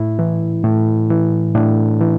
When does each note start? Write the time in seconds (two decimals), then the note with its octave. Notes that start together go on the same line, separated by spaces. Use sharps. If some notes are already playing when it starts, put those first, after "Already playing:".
Already playing: A2 E4
0.19 E3
0.64 A2
1.10 E3
1.54 A2 D4
2.01 E3